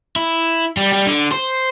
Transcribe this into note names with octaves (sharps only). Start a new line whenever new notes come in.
E4
G3
G3
D3
C5